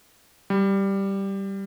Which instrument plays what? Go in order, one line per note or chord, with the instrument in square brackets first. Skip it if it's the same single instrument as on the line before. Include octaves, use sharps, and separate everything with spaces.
[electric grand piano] G3